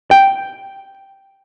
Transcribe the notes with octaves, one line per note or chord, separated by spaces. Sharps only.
G5